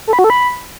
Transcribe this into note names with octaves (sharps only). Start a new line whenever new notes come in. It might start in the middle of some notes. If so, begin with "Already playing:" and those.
A4
B5
F#4
A4
B5